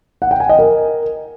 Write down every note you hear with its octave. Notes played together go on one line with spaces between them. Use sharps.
F#5
G5
G#5
D#5
A#4